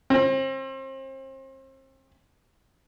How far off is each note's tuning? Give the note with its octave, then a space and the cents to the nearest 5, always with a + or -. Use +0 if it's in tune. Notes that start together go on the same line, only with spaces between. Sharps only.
C4 +35